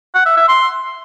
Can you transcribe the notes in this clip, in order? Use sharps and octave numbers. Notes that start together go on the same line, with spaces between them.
F#5
E5
E5
C6